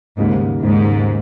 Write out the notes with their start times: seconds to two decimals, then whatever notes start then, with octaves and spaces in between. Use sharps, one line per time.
0.17 D#2 G#2 C#3 G3 A#3
0.63 D#2 G#2 C#3 G3 A#3